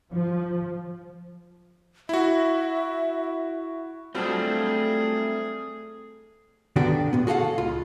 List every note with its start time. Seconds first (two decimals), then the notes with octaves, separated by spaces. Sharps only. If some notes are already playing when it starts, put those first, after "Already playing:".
0.13 F3
2.09 E4 F#4 E5
4.15 F#3 G3 A3 C4 D4 F4 G#4 A4
6.76 D3 D#3 B3 D4 F#4 G4
7.13 A#2 B3
7.27 F#4 G#4 A4 F5 F#5
7.58 C#2 F4